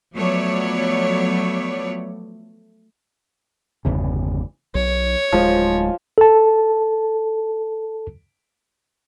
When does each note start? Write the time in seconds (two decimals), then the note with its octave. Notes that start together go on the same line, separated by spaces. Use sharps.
0.14 F3 F#3 A3 B3 C#5 D5
3.85 G1 E2 C#3
4.75 B1 C#5
5.32 D1 F3 G#3
6.18 A4 A5